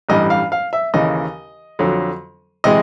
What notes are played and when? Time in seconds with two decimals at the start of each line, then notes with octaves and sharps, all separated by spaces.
0.09 A1 G2 E3 G3 D#5
0.30 F5
0.52 F5
0.73 E5
0.94 D#2 C#3 E3 D#5
1.79 F2 D3 F#3
2.64 C3 E3 G#3 D#5